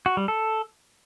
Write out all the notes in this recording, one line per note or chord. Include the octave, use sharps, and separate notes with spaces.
F#4
G3
A4